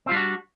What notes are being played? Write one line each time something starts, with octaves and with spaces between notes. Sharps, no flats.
G3 C4 D4 F4 F#4